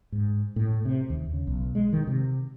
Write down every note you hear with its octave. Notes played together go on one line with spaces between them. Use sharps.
G#2
A2
C3
D#2
C#3
B1
G#3
D#3
C3